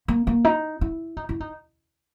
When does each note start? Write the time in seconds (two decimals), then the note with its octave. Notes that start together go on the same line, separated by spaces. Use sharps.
0.08 A#3
0.27 A#3
0.45 D#4
0.81 E4
1.17 D#4
1.29 E4
1.40 D#4